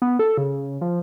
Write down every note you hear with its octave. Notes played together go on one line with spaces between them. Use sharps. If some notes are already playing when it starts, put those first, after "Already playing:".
B3
A4
C#3
F3